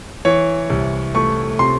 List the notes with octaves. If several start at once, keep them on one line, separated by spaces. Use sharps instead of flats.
E3 C#5
C2
A3 C#6
C3 C6